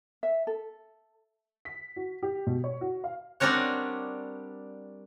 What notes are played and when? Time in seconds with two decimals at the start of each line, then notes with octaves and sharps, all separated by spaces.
0.23 E5
0.47 A4
1.65 B6
1.96 F#4
2.22 G4
2.47 B2
2.64 C#5
2.81 F#4
3.04 F5
3.40 G3 C4 D4 A#4 C#5 F#5